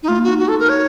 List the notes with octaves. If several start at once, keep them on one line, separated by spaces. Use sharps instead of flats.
D#4
A3 F4
A#3
F#4
D#4
F#4
A4
A#4
C#5